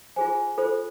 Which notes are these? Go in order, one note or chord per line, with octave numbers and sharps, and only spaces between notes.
F4 G#4 C5 G#5
F4 A4 C5